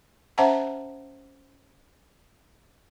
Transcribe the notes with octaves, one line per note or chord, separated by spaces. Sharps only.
C#4 C5 E5 F#5 A5 A#5